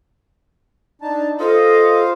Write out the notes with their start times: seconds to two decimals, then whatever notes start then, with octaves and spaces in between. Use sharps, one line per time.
1.02 D4 D#4 A5
1.40 F4 A4 C5 D#5 F5